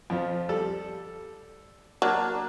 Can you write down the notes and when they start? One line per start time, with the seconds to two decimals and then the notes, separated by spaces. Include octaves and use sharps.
0.10 F2 F3
0.49 G3 A4
2.02 F#3 A#3 D4 A5